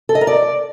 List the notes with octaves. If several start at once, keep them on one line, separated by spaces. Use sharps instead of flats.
A4
D#5
A#4
D5